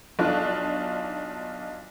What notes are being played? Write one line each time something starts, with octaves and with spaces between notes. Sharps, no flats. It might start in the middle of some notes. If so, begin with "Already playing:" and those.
B1 D4 D#4 F4 F#6